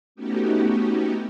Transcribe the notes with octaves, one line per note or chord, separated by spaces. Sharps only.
A3 B3 C#4 D#4 F#4 G4